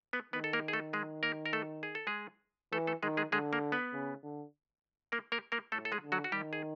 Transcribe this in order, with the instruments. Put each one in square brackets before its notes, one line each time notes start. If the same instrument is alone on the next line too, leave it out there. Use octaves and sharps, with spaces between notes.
[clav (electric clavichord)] B3 B4
[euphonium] D#3 [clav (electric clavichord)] B3 B4
[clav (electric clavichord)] A4
A#3 A#4
G#4
A3 A4
G#3 G#4
A#3 A#4
A#4
A3 A4
G#4
A4
G#3 G#4
[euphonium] E3 [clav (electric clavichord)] A3 A4
[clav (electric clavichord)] A3 A4
[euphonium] D#3 [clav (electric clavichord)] G#3 G#4
[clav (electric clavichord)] G#3 G#4
[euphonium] D3 [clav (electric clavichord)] G#3 G#4
[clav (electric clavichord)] A#3 A#4
B3 B4
[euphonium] C#3
D3
[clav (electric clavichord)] A#3 A#4
A#3 A#4
A#3 A#4
[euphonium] A2 [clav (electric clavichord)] A3 A4
[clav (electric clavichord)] A4
G#3 G#4
[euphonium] D3
[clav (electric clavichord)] F#3 F#4
F#4
[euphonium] D#3 [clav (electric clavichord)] G3 G4
[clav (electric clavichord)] G#4